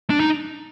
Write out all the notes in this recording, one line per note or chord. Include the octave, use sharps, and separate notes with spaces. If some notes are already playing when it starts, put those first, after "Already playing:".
D4
D#4